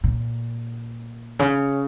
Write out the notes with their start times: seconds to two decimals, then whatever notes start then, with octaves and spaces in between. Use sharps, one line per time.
0.04 A#2
1.39 C#3